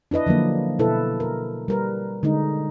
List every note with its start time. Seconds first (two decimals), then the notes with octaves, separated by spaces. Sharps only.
0.11 D4 E4 B4 D#5
0.26 D3 F3 F#3 A#3
0.79 B2 E4 A4 B4
1.20 A#4
1.68 G3 A#4 B4
2.23 D3 G#3 D#4